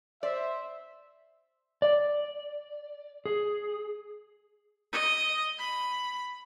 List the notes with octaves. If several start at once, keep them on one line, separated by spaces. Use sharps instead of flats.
C5 D5 E5
D5
G#4
D#5
B5